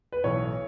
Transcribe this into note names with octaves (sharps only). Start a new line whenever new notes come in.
B4
B1 A2 E3 C#5